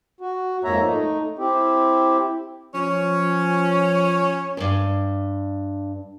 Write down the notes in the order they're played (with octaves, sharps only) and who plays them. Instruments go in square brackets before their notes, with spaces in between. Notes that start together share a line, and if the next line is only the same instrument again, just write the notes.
[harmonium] F#4
F2 G#2 A#3 C#5 E5 A#5
A3 D#4
C4 E4 G4
[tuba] F3 [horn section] C#4 [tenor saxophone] C#5
[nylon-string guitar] E2 G2